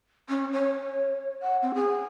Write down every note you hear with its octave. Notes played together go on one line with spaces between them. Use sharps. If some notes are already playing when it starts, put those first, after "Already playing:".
C#4
C#5
F#5
C4
G#4